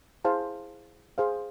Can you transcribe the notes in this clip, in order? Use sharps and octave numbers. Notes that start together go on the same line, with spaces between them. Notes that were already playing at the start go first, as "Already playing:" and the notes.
E4 G#4 C5 F5 A5
G#4 C5 F5